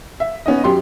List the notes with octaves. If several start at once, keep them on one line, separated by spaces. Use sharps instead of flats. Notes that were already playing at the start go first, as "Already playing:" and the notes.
E5
B3 C#4 D#4 D#5
F#2 G4 C6